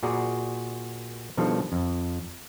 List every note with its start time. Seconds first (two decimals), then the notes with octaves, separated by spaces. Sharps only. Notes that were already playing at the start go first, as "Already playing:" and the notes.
0.03 A#2 F#4 G#4 D5 A#5
1.37 B2 D#3 F3 G3 D4 A4
1.72 F2